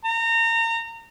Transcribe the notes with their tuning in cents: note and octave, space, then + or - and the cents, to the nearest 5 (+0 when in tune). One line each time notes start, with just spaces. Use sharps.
A#5 -30